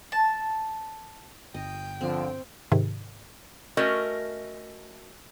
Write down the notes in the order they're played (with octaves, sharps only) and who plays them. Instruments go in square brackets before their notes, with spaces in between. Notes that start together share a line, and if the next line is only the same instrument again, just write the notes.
[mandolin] A5
[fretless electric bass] G1 [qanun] D#5 [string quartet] G5
[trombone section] D3 F3 [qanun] C4
[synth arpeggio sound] G#2 C3 D#3
[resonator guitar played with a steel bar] A3 C#4 F#4 A#4 D#5